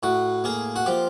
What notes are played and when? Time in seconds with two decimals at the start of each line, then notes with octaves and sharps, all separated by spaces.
0.03 A2 F#4
0.44 A#3 G#4
0.76 F#4
0.86 F3 G4